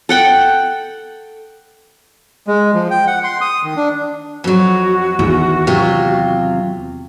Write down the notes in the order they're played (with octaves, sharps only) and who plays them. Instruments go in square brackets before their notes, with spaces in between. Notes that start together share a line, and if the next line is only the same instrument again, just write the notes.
[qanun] A4 F#5 G5
[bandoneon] G#3
F3
G5
F#5
C6
D#6
D#3
D4
[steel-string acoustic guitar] F2 F#3 [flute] F#4
[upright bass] E2 D#3
[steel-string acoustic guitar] C3 F#3 F4